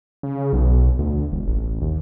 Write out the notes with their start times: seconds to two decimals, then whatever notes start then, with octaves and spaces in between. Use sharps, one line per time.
0.23 C#3
0.53 B1
0.99 D2
1.32 E1
1.47 A1
1.81 D#2